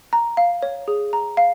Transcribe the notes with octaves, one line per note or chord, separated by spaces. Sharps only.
A#5
F5
C#5
G#4
A#5
F5